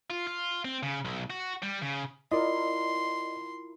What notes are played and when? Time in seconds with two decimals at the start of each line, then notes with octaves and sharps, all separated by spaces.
0.10 F4
0.27 F4
0.65 C4
0.83 C#3
1.05 B1
1.30 F#4
1.63 G3
1.82 C#3
2.32 E4 F4 A#4 D5 D#5 C6